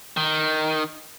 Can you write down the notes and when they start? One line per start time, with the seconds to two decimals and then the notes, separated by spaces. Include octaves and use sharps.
0.17 D#3